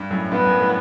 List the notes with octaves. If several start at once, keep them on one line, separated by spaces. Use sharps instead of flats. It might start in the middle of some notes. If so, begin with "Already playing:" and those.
Already playing: G2
F#2 A2
G2 B3
F#2
A2